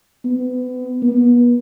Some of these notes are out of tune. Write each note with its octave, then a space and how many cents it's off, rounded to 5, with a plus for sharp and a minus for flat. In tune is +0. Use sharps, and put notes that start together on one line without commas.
B3 +30
B3 -35